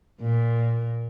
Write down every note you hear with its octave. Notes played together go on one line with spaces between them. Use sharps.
A#2